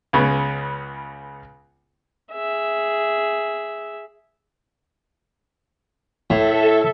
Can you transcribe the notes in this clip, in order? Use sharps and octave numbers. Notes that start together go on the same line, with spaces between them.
C#2 C#3 B3
G#4 E5
A2 A4 E5